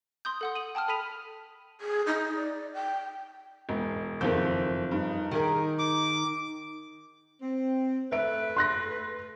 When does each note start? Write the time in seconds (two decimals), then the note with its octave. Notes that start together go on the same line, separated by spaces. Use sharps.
0.25 C6 D#6 G6
0.41 A4 F#5 D#6
0.55 D#7 F#7
0.75 G5 A5 D#6 F6
0.88 A4 B5 B6 D#7 F7
1.81 G#4
2.06 D#4
2.35 D5
2.74 G5
3.69 E1
4.21 F#1 F2 D#3 G6
4.91 G2 D#4
5.31 D#3 G4 G#4 A#4
5.79 D6
7.42 C4
8.12 A3 B4 E5 D7
8.56 C6 F#6 A#6